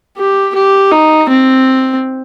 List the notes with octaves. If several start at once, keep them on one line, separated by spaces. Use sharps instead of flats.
G4
G4
D#4
C4